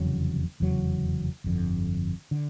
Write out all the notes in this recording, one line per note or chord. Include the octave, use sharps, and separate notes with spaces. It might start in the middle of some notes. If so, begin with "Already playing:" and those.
Already playing: F1 E2 C#3 F#3
F1 E2 C#3 F#3
G1 F2 D3
D3